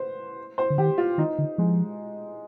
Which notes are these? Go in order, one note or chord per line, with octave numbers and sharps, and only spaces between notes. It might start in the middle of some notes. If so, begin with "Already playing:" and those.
Already playing: B4 C5
C5
D3
D#3 G4
F4
D#3 D#4
D3
F3 G#3